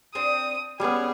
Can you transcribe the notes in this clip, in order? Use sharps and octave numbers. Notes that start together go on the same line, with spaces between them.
C4 D4 C5 D#6
C#3 G3 B3 C#4 G#4